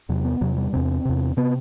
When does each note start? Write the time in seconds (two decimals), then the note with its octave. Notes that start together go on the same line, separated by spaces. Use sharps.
0.09 E2 C3 F#3
0.25 B3
0.41 E2 C3 F#3
0.57 G3
0.73 E2 C3 C4
1.05 E2 C3
1.37 C3 B3